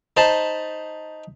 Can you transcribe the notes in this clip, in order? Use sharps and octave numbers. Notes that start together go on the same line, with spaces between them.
D#4 C5 A5 B5